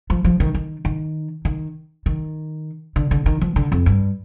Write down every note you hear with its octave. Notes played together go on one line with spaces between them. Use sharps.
F3
F3
D#3
D#3
D#3
D#3
D#3
D3
D3
D#3
F3
D3
F2
G2